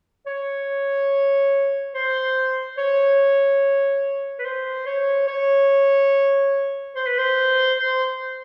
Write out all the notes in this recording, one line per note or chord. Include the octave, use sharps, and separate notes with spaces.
C#5
C5
C#5
B4
C5
C#5
C#5
C5
B4
C5
C5